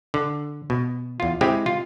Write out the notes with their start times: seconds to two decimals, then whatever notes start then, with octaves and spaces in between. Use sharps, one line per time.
0.14 D3
0.70 B2
1.20 E2 F4
1.41 G#3 C4 E4 G4
1.66 F4